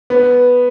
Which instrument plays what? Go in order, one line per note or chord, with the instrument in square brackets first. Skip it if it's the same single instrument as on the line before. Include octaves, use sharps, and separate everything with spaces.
[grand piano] B3